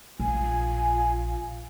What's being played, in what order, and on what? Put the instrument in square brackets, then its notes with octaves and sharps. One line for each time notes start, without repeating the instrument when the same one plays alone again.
[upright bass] A#1 [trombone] F4 [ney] G#5